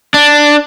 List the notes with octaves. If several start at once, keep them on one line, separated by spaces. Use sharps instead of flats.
D4